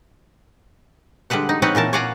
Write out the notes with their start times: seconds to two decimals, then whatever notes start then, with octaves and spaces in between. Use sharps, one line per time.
1.30 D3 G3 G#3 B4 F#5
1.49 D#4
1.62 C4 C#4 D#4 B4 F#5
1.75 A#2 E3 A#4 A5
1.93 C#5 D5 F5 F#5 G#5 A#5